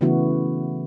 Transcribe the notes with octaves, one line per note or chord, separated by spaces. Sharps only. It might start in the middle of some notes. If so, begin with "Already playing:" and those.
C#3 E3 A3 B3 E4 F#4